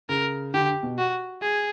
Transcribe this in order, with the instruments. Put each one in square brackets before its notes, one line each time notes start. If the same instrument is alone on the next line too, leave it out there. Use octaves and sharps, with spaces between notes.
[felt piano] C#3 [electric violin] A#4
[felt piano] D3 [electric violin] G4
[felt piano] B2
[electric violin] F#4
G#4